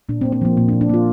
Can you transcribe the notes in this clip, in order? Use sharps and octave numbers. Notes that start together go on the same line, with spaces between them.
A#2 D4
C4
A#3
C4
F3 A#3
A#2 A#3
D4
A#2
D4
A#3 F4